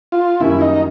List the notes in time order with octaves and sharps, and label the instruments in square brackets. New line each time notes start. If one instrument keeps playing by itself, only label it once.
[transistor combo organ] F4
[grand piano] F#2 D#3 G3 A#3 C#4 [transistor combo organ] E4
[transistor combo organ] D#4